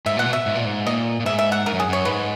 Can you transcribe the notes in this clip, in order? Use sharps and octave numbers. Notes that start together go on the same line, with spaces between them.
G#2 E5
A#2 F#5
B2
E5
G#2
A#2
G#2
A#2 D#5
A#2
G#2 E5
E5
F#5
G#2 A#4
F#2
G#4
F#2 C#5
G#2 B4